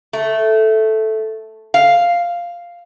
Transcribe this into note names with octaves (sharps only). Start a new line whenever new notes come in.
A3
F5